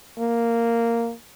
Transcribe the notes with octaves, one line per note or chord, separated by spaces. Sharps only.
A#3